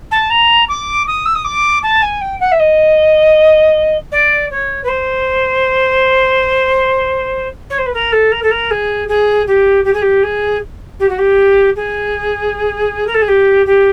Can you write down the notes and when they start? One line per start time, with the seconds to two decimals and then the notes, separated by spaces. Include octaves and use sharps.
0.11 A5
0.30 A#5
0.68 D6
1.06 D#6
1.25 E6
1.34 D#6
1.44 D6
1.82 A5
2.02 G#5
2.21 G5
2.40 F#5
2.51 E5
2.59 D#5
4.11 D5
4.50 C#5
4.83 B4
4.88 C5
7.69 C#5
7.77 C5
7.85 B4
7.93 A#4
8.12 A4
8.31 A#4
8.42 A4
8.50 A#4
8.70 G#4
9.08 G#4
9.47 G4
9.84 G4
9.93 G#4
10.01 G4
10.23 G#4
10.99 G4
11.08 F#4
11.18 G4
11.75 G#4
13.06 A#4
13.14 A4
13.21 G#4
13.27 G4
13.66 G4